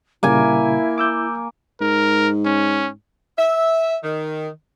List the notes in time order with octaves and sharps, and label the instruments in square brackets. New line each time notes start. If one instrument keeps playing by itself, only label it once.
[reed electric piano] A#2 C#3 G3 [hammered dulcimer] A#3 G#5 [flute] E4
[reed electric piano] D6 E6 G6
[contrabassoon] G#2 [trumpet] A#4
[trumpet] C#4
[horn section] E5
D#3